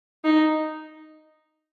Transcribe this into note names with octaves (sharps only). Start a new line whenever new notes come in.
D#4